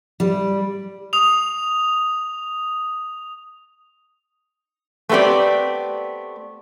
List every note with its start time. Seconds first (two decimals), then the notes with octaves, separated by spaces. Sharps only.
0.20 G3
1.13 D#6 F7
5.09 A3 B3 C4 G4 D5